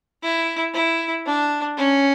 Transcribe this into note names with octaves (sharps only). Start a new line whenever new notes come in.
E4
E4
D4
C#4